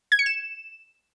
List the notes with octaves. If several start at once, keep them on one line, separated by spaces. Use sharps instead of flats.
G#6
C#7
E7